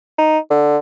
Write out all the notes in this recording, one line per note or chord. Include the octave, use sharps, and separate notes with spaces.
D#4
D3